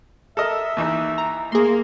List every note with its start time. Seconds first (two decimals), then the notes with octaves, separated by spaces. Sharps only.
0.37 A4 A#4 D#5 E5
0.77 D#2 E3 D#4
1.18 A#5
1.52 A#3 G#4 C6